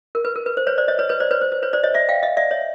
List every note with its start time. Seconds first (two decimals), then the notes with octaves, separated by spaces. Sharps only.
0.15 A#4
0.25 B4
0.36 A#4
0.46 B4
0.57 C5
0.67 B4 C#5
0.78 C5 D5
0.88 C#5 D#5
0.99 B4 C#5
1.09 B4 C#5
1.20 C5 D5
1.31 B4 C#5
1.42 C5
1.52 C5
1.63 B4 C#5
1.73 C5 D5
1.83 C#5 D#5
1.94 D5 E5
2.09 F5 G5
2.23 D#5 F5
2.37 D5 E5
2.51 C#5 D#5